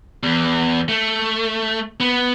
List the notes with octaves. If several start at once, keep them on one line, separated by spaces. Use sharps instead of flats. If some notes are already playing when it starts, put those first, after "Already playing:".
E2
A3
B3